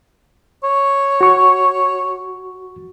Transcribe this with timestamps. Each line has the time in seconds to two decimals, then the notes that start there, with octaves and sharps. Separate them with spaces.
0.64 C#5
1.21 F#4 C#6